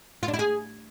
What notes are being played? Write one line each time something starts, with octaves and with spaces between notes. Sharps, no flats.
F4
D4
E4
G#4